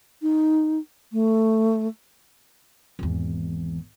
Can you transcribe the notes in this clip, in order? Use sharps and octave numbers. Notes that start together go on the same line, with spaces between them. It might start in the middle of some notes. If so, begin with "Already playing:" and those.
D#4
A3
G#1 E2